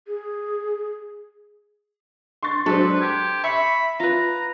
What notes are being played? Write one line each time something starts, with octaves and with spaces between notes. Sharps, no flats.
G#4
C6 C#6 A6
F#3 G#3 D4 A4 B4 C5
G4 G#6
E5 B5 C#6
F4 B4 A#5